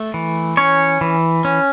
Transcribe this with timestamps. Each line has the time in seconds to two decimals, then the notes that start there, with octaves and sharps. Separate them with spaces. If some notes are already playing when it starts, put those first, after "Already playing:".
Already playing: A3
0.14 E3
0.57 C#4 C#5
1.01 E3
1.45 C#4